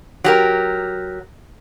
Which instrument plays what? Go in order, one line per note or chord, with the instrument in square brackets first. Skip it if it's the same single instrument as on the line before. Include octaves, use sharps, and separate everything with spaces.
[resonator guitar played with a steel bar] F#3 G4 A#4